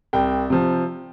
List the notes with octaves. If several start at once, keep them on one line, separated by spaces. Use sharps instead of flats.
C2 G5
C3 F3